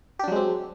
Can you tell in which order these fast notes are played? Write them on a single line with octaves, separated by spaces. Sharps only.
G4 D4 F#3 G#3 C4